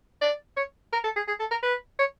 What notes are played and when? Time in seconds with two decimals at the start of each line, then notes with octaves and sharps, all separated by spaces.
0.21 D5
0.57 C#5
0.93 A#4
1.04 A4
1.16 G#4
1.28 G#4
1.40 A4
1.51 A#4
1.63 B4
1.99 C#5